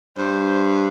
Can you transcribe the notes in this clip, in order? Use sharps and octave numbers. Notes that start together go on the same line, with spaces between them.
G2 C5